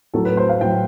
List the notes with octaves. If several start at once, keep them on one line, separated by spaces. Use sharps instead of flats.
A2 F#3 A4
B4
C5
F5
A2 F#3 G5